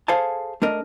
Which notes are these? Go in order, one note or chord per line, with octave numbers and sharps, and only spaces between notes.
G#4 A4 C5 F5 G#5 A5
A3 D4 A#4 D#5